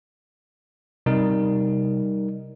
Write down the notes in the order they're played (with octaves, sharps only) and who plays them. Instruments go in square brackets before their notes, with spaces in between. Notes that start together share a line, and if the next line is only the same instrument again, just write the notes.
[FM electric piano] C3 [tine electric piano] G3 D#4 A#4